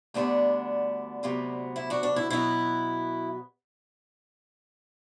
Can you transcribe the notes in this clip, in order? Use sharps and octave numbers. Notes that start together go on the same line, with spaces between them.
D2 D3 G3 B3 D4
D2 C3 F#3 B3
E4
D4 F#4
D4
E4
B2 F#3 B3 E4